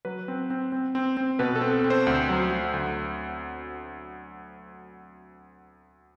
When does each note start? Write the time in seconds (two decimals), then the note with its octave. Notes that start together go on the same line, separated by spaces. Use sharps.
0.05 F#3 B4
0.28 C4
0.50 C4
0.72 C4
0.95 C4
1.17 C4
1.39 B2 B4
1.56 A4
1.61 C4
1.84 C4
1.90 C5
2.07 D2
2.29 F#3
2.51 F#3
2.74 D2